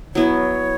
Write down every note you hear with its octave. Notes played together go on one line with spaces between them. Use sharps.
F#3 B3 E4 C#5